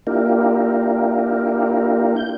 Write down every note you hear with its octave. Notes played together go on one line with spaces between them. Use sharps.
A#3 D4 E4 F4 G4 A#4
G6